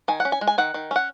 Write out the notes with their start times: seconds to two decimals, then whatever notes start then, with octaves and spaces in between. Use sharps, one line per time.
0.08 D#3 G#5
0.20 F#5
0.25 C#4
0.32 G#5
0.41 G#3
0.47 G#5
0.58 D#3 F#5
0.74 D#3
0.91 C#4 F#5